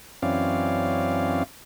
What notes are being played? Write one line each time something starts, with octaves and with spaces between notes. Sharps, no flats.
F#2 E3 C4 C#4 D5 F5